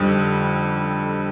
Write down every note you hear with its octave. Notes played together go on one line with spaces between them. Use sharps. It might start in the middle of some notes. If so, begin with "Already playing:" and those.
Already playing: F2 D3 G3